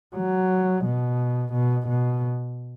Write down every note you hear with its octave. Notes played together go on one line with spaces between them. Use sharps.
F#3
B2
B2
B2